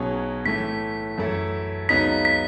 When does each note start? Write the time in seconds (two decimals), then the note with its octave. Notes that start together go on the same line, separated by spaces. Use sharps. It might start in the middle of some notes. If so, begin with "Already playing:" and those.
Already playing: B1 B2 F#3 C#4 G#4
0.45 A2 E3 A3 B6
1.18 F#2 E3 A3 E4 A4
1.89 C#2 C#3 F#3 B3 D#4 B6
2.25 B6